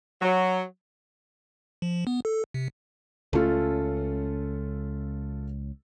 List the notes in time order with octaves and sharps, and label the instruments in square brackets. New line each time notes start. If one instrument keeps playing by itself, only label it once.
[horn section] F#3
[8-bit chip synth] F3
B3
A4
C3
[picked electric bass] C#2 C#4 [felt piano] A3 F4 A4